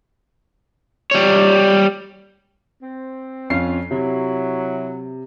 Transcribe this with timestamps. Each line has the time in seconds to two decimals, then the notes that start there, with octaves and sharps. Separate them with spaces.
1.11 G3 C#5
2.82 C4
3.50 F2 C#4 F4 F5 C7
3.91 C3 F#3 E4